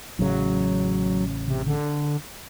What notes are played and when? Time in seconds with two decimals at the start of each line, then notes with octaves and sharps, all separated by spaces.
0.19 A1 C#3 F#3
1.48 C3
1.66 D3